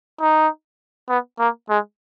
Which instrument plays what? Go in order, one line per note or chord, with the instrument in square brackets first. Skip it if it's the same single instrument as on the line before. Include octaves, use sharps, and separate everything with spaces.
[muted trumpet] D#4
B3
A#3
G#3